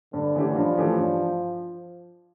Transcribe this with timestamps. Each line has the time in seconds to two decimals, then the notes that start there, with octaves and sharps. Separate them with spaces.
0.13 G2 D3
0.35 E3 A3 C#4 G4
0.55 G2 F3
0.77 E3 A3 C#4 G4
0.98 G2